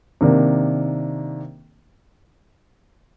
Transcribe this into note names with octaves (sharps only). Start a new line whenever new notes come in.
C3 D#3 A#3 D4